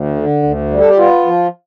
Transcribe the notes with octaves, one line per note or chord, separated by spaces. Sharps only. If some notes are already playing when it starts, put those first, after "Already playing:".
Already playing: D2
D3
D2
G3
A4
G4
B3 F4
F3